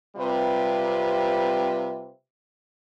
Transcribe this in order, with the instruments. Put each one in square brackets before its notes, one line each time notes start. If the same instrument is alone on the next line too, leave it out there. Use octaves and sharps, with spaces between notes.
[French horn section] C3 G3 C4 F4 B4